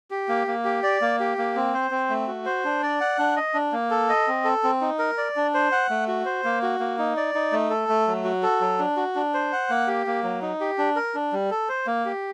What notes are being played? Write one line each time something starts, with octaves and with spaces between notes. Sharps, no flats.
G4
A#3
A#3
G4
D5
A#3
G4
A#3
C4
C5
C4
A3
F#4
C5
D4
D5
F#5
D4
D#5
D4
A#3
A4
D#5
C4
A4
C4
D#4
A#4
D5
D4
C5
F#5
A3
F#4
C5
A#3
F#4
A#3
D#4
D5
D#4
A3
A4
A3
F#3
F#4
A4
F#3
D4
F#4
D4
C5
F#5
A#3
G4
A#3
F#3
D#4
G4
D4
A#4
D4
G3
A4
C5
A#3
G4